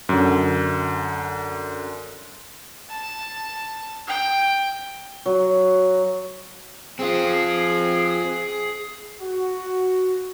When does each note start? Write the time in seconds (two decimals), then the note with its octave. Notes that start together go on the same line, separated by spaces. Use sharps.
0.09 F#2 D3
2.90 A5
4.07 G5
5.26 F#3
6.99 C4 F4 G#4
9.21 F#4